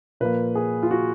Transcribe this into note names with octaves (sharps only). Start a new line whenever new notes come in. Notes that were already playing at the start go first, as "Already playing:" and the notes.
A#2 F3 A#3 B4
G#4
F4
F#4